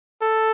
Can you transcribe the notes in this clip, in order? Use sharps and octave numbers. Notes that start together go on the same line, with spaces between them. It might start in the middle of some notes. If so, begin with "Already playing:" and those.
A4